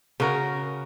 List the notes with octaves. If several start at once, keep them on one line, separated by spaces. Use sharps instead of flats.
C#3 C#4 F#4 A#4